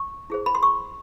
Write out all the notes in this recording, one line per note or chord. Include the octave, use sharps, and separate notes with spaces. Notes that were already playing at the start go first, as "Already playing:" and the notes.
Already playing: C#6
E4 G#4 C5
B5
C6
C#6